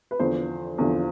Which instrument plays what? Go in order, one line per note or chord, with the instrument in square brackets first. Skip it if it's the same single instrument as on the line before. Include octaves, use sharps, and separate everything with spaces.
[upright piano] B4
E2 D3 F3 C5
E2 D3 F3